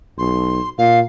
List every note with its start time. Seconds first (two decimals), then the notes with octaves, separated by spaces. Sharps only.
0.18 B1 C6
0.78 A#2 F5